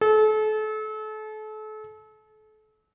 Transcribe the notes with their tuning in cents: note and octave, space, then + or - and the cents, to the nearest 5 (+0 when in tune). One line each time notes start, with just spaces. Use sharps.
A4 -35